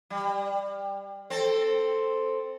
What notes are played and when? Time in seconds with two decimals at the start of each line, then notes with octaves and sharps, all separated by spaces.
0.10 G3
1.30 C4 A4